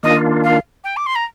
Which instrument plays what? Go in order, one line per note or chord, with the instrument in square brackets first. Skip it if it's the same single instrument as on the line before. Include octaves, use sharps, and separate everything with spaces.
[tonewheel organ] D#3 A#3 D4 F4 [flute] D#5
[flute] F5
G5
D6
C6
A#5